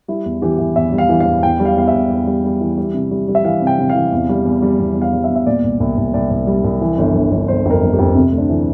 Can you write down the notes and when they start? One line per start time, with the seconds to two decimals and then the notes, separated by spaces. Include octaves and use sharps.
0.08 G3 E4
0.26 E2
0.42 E3 G4
0.58 E3
0.76 E2 E5
0.93 G3
0.98 F5
1.09 E3
1.20 F5
1.26 E2
1.43 E2 G5
1.60 G3
1.65 F5
1.77 E2 F5
1.88 E5
1.93 E2
2.10 E2
2.27 G3
2.44 G3
2.61 E3
2.78 G3
2.94 C3
3.11 G3
3.28 G3
3.35 E5
3.44 E3 F5
3.62 C3
3.67 G5
3.78 C3
3.89 F5
3.95 E3
4.12 E2
4.29 G3
4.46 E2
4.62 G3
4.79 E2
4.96 E2
5.02 F5
5.13 G3
5.24 E5
5.29 E2
5.36 E5
5.46 A#2 D5
5.63 C2
5.80 C2
5.97 C2
6.14 C2 D5
6.31 C2
6.47 G3
6.64 C2
6.81 E3
6.98 G1
7.15 G1
7.31 G1
7.48 G1 C5
7.65 F2 A#4
7.82 G1
7.93 G4
7.98 F2
8.15 C3 C4
8.32 D2
8.38 D4
8.49 E3